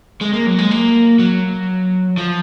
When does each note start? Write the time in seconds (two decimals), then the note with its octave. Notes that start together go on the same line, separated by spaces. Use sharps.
0.21 G#3
0.33 A#3
0.46 F#3
0.59 G#3
0.71 A#3
1.19 F#3
2.18 F3